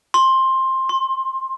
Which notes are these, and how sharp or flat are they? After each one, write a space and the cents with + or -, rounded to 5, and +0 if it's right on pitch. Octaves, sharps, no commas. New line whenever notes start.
C6 +15
C6 +35